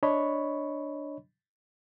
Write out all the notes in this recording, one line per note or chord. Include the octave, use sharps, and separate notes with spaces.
D4 C#5 D#5 B5 C#6